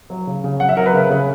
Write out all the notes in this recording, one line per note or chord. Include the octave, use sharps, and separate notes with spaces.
F#3
C#3
C#3
F#3 F#5
E5
F#3 A#4
B4
C#3
C#3